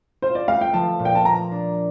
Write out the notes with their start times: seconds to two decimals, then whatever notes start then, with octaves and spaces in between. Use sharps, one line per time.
0.22 F4 C5
0.35 D5
0.48 A3 F5
0.61 G5
0.74 F3 A5
0.99 A#2
1.05 G5
1.15 A5
1.25 A#3 A#5
1.51 D4